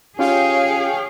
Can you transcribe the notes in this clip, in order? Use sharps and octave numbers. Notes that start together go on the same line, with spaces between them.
C#4 F4 G4 G#4 C#5 F5 G5